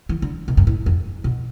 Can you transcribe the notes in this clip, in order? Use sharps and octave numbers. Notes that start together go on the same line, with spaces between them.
E3
D3
B2
G2
A2
F2
B2